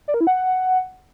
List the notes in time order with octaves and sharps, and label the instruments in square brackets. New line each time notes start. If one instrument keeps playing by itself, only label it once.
[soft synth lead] D5
A#4
E4
F#5